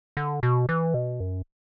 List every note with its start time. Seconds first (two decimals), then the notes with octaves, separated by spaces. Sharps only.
0.17 D3
0.43 B2
0.69 E3
0.94 B2
1.20 F#2